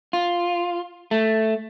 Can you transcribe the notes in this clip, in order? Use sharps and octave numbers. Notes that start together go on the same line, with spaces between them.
F4
A3